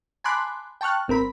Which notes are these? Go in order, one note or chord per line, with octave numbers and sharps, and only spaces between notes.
G#5 A5 B5 C6 D6 F#6
G5 A5 C#6 F6 F#6
G1 C4 A#4 B5